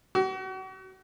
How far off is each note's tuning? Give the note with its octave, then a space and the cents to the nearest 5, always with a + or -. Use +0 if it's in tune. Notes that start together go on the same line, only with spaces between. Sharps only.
F#4 +40